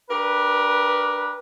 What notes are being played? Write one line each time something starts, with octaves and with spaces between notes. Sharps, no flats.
D4 G4 A#4 B4